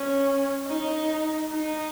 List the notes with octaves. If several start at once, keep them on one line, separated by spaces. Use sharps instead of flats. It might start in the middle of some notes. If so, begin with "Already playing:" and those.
Already playing: C#4
D#4
D#4